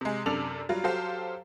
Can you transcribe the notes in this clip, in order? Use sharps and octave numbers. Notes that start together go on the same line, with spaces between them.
C3 G#3
F#2 C3 D4 A4 D5 F7
F#3 G3 F4
F#3 G4 A4 C5 F5